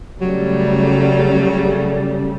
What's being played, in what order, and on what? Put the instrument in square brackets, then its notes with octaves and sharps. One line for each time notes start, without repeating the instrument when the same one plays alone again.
[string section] C#3 G3 A3 [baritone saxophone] F#3